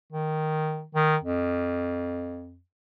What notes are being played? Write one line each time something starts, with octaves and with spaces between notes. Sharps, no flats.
D#3
D#3
F2